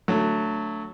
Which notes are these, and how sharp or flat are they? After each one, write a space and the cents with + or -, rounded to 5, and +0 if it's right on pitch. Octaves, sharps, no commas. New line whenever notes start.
D3 +0 F#3 +0 A3 +10